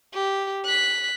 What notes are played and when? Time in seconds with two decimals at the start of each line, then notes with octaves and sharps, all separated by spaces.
0.14 G4
0.65 F#6 B6